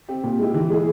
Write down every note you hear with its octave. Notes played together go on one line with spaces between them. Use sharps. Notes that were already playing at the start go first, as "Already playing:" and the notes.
C4 G4
A#2
G#3 E4 G4
E3
G#3 E4 G#4